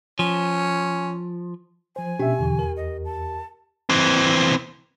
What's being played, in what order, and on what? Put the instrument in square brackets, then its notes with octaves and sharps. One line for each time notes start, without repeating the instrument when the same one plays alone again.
[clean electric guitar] F3 [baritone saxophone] C#4
[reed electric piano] F3 C5 [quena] G#5
[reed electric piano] B2 E5 [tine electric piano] C#4 D4 G5 [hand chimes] G4
[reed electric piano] E2 [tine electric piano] B2 D3 E3
[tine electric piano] A#4
[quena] D#5
A5
[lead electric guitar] E3 C4